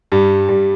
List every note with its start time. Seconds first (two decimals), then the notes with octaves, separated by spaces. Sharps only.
0.12 G2 G3
0.48 G2 G3